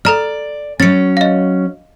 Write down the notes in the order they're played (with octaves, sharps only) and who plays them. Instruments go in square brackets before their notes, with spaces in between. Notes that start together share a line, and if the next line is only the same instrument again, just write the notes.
[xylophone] A4 A#5 F6 [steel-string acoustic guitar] D5
[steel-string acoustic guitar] F#3 C#4 [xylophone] A6 C#7
[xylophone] D#5 F5